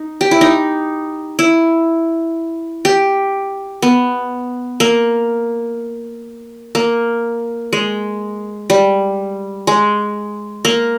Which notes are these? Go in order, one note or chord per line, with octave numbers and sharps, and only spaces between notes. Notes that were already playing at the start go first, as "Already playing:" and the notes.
Already playing: D#4
G4
E4
D#4
E4
G4
B3
A#3
A#3
G#3
G3
G#3
A#3